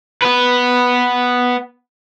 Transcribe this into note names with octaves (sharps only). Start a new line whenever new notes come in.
B3 B4